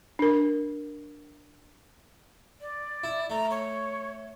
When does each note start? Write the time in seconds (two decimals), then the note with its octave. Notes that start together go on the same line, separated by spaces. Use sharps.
0.19 D4 A#4
2.61 D5
3.03 E4
3.30 A3 A#5
3.51 C#5